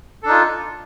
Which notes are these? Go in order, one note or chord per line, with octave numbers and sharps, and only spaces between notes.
D4 D#4 F4 A4